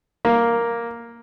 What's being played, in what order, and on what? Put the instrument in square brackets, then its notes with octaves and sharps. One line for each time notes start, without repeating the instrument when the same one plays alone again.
[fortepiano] A#3